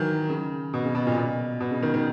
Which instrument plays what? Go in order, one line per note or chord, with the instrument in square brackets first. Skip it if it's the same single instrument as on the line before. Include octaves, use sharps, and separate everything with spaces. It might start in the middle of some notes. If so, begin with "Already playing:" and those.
Already playing: [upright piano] D#3 E3 F#3
C#3
B2
C#3
B2
A#2
B2
B2
C#3
D#3
D#3